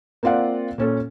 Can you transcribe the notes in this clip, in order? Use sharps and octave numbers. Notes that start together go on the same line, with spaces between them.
A#3 C4 F4 D5 F#5
A#2 C#4 A4